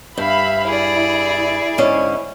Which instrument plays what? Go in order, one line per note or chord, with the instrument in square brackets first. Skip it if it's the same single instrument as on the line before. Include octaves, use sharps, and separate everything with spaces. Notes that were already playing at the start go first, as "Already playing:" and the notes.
[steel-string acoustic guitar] G2 [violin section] E5 F5 B5
[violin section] E4 [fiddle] G#4 D5
[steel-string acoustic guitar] G#2 D3 C#4